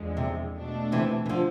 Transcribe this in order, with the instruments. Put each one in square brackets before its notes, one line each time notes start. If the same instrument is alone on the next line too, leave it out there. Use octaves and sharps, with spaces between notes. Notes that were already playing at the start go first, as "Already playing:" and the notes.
Already playing: [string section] E2 D3 F3 G#3
[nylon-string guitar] C3
[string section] B2 A3 D4
[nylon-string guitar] C3 E3
E3
D3 F3